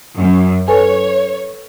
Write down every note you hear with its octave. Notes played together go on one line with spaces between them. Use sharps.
F#2
A4 B4 C#5 G#5